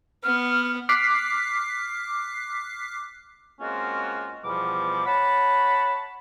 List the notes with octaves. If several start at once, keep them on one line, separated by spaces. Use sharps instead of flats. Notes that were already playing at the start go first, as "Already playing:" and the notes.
B3 F6
D6 F6 F#6 B6 C7
G#3 A#3 C4 C#4 F4 F#4
E2 B2 F3 G3 D6
C#5 F#5 A5 B5